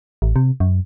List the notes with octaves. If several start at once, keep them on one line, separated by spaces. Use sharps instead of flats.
A1
C3
F#2